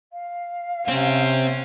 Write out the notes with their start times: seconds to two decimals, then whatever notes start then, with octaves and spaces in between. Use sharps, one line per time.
0.12 F5
0.88 C3 C4 C#4